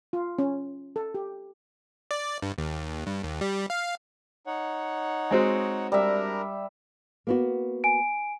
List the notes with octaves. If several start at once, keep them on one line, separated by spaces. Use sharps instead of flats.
F4
C#4
A4
G4
D5
G2
D#2
G2
D#2
G3
F5
D#4 C#5 F#5
G#3 C4 F#4
G3 D4 A#4 E5 A#5
A#3 B3 F#4
G#5 D7